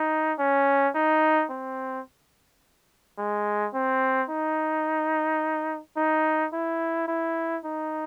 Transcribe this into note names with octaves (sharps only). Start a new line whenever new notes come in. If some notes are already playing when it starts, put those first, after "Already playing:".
Already playing: D#4
C#4
D#4
C4
G#3
C4
D#4
D#4
E4
E4
D#4